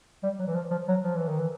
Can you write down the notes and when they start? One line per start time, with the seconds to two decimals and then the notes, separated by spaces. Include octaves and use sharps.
0.23 G3
0.39 F#3
0.47 E3
0.55 F3
0.71 F3
0.88 F#3
1.04 F3
1.16 E3
1.28 D#3
1.39 E3